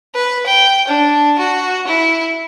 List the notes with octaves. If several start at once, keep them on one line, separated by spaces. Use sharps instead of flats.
B4
G5
D4
F#4
E4